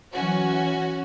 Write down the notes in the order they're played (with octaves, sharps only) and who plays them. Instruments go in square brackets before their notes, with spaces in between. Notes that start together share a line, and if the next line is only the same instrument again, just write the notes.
[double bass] E3 F#3 [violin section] C#4 F#4